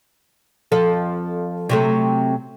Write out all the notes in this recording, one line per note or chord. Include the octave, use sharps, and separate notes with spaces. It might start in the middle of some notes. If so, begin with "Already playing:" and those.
F2 F3 A4
C3 F#3 A3